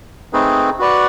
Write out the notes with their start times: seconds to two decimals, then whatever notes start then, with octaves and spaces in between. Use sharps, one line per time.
0.33 A3 C4 D#4 G#4 B4
0.79 F#4 B4 D5 F#5